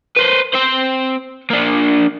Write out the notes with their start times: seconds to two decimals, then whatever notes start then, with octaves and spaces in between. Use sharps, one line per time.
0.17 B4 C5
0.54 C4 C5
1.50 A#3 D4